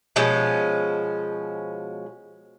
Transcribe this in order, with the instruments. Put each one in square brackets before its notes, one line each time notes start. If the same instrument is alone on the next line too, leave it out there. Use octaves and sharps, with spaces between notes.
[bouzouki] B2 F3 G#3 C#4